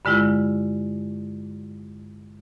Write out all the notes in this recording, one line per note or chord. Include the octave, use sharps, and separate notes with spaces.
G2 D3 G#3 E4 F4